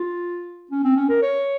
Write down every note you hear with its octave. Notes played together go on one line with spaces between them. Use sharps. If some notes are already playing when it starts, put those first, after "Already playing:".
Already playing: F4
C#4
C4
C#4
A#4
C#5